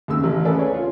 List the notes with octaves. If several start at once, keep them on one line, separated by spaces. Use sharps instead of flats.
D#2 C#3 E6
A1
G#4 A4 B4 D5
C#5
F4